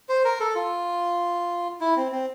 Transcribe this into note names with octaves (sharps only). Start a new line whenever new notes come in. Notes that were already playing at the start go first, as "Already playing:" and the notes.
C5
A#4
A4
F4
E4
C4
C4